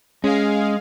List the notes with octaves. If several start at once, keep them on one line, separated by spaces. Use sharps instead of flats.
G#3 C#4 G#4 F5